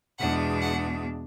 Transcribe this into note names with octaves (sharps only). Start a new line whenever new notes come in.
E2 B2 G#3 D4 F#5
F#5